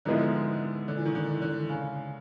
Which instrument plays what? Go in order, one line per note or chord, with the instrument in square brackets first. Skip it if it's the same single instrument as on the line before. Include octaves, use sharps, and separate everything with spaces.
[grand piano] G#2 F3 G#3 B3 E4 [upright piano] D3
[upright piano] D3
E3
D#3
D3
D3
C#3